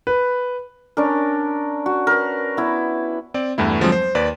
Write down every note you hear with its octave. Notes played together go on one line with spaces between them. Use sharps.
B4
C#4 D4 A#4
F#4
A#4 B4
B3 E4
C4 D5
E2 G2 A3 E4
D3 F3 F#3 G#3 C4
C5
D#2 B4 D5